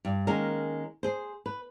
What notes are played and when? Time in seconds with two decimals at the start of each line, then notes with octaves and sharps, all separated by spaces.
0.05 G2
0.27 D#3 G#3 A#3 C#4 A#4
1.03 G#4 C5
1.46 B4